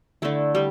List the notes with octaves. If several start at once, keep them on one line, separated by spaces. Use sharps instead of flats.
D3 A3 E4
G3